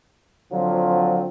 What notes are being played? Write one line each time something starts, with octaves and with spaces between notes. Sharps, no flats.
D3 F3 F#3 C4 F4